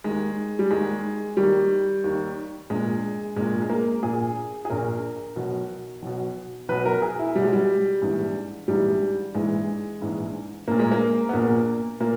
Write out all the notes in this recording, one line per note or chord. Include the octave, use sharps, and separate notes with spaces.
D#2 D#3 G#3
G3
D#2 D#3 G#3
D#2 D#3 G3
D#2 D#3
A#1 A#2 G#3
A#1 A#2 G#3
G#3
A#3
A#1 A#2 G#4
G#4
A#1 A#2 A#4
B1 B2
B1 B2
B1 B2 B4
A#4
G#4
E4
B1 B2 G3
G#3
G3
A#1 G#2 E3
A#1 G#2 E3 G3
A#1 G#2 E3 G#3
A#1 G#2 E3
A#1 A#2 A#3
G#3
A#3
B3
A#1 A#2 A#3
A#2 A#3